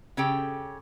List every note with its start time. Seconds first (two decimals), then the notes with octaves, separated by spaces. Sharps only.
0.17 C#3 C#4 G4 A4 G5